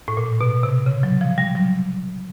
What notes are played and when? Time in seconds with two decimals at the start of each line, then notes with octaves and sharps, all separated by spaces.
0.08 A2
0.17 A#2
0.41 B2
0.63 C3
0.86 C#3
1.03 F#3
1.21 F3
1.38 G3
1.55 F#3